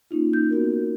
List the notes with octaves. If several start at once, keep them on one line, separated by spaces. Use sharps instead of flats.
A#3 C#4 D#4 F4
D#4 G6
B3 F#4 A#4